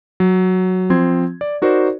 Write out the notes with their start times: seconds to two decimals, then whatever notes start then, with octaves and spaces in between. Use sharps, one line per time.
0.20 F#3
0.90 F3 C4 C6 G#6
1.41 D5
1.62 D#4 F#4 A#4 C5 D5